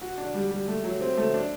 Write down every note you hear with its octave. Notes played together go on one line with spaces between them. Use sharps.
F#4
D4
G3
G3
A3
F#3
C4
A3
D4